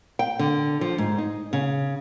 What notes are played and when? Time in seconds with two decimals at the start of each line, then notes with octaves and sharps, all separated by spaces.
0.19 G5
0.39 D3
0.81 F3
0.98 G#2
1.18 D#4
1.53 C#3